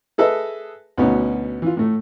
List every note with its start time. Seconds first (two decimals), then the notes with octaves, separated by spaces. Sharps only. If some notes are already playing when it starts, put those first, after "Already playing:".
0.18 G#4 A4 B4 D#5 E5 A5
0.98 D2 B2 B3 C#4 D#4
1.62 E3 F4
1.77 A2 A3